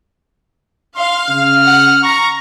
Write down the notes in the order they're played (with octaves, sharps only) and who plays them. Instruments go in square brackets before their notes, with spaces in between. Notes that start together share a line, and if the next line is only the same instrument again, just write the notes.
[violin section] F5 [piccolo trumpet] C6
[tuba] C#3 [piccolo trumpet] F6
[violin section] F#5
[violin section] A#5 [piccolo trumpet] C#6